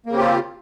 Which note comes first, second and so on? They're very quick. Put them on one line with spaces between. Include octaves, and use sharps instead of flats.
A#3 C#3 C4 G4 F4